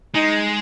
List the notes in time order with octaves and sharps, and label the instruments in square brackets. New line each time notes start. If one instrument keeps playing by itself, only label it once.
[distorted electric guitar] G#3 [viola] D#4